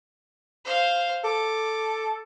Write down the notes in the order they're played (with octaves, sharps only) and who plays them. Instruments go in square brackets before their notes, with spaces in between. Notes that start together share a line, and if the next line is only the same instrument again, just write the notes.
[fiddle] C5 F5
[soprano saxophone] A4 [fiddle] D6